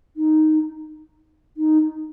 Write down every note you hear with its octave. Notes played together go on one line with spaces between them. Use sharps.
D#4
D#4